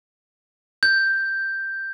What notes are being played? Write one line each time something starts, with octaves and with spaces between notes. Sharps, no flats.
G6